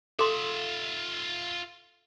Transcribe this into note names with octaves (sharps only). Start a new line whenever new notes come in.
F4 G#4 A4 E5 C6